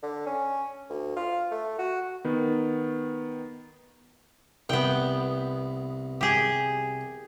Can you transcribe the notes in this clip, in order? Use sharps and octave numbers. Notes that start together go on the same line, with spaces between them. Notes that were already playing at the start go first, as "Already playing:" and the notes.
D3
C#4
D2
F4
A3
F#4
D#3 B3
C2 B3 G5
G4 G#4